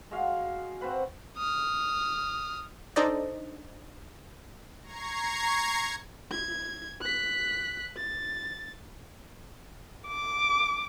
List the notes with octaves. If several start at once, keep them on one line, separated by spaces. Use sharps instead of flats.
G#3 F#4 F5
C4 F#4 B4 F#5
D#6 F6
D4 D#4 A4 C5 D5 D#5
A#5 C#6 G#6 C7
G#6
F#6 B6
A6
D6